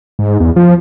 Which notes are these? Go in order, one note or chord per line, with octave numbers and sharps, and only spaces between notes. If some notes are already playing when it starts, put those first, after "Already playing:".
G#2
E2
F3